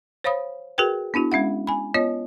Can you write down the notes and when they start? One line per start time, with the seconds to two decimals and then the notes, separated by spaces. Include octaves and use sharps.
0.24 C5 C#5 F5 B5 D#6
0.78 F#4 G#4 A#4 B4 G5
1.14 B3 D4 E4 F#4
1.32 G#3 C#4 E5 F#5
1.67 G#5 B5
1.94 B3 F4 C#5 D#5